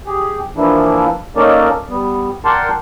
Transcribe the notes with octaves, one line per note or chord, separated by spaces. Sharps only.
G4 G#4
E3 F3 A#3 D4 E4
A#3 C#4 D#4 A4 A#4 D5
G3 B3
A#4 D5 F#5 G5 A5 C6